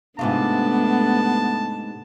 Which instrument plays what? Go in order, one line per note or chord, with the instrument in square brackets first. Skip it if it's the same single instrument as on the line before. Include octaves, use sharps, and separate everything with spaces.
[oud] G#2 C3 F4 [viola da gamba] A3 D4 [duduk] B3 [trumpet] A5